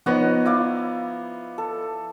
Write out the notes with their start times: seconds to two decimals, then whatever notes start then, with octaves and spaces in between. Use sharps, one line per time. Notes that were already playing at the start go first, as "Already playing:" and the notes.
0.06 F3 B3 D#4 C#5 D#5 F#5
0.46 E4 D5 F5
1.58 A4